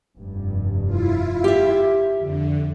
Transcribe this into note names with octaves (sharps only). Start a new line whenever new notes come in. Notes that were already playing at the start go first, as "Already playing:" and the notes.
F1 G2
E4 F4
G4 E5
F2 D3